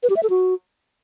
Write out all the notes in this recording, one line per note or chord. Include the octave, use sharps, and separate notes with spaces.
B4
G4
E5
A4
F#4